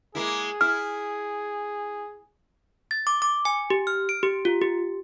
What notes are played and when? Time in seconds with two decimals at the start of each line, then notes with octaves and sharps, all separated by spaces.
0.15 G#3 A#3 E4 G#4
0.61 E4 F6
2.91 A6
3.07 D6
3.22 D6
3.45 G#5
3.70 G4
3.87 F6
4.09 D7
4.23 G4
4.45 F4
4.62 G4